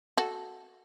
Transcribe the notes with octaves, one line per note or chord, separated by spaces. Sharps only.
F#4 A4